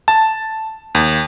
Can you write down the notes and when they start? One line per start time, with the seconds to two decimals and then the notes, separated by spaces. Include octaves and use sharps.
0.08 A5
0.95 D#2